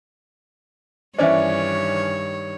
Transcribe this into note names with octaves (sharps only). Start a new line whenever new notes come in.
G2 D#3 E3 C#4 D4 C5 C#5 E5